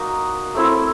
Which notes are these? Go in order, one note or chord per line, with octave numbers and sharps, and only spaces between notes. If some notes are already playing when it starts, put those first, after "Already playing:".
Already playing: A#3 D#4 F#4
A3 C4 E4 A4